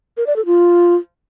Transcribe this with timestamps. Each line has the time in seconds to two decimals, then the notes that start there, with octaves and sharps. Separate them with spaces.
0.17 A#4
0.27 D5
0.36 A4
0.46 F4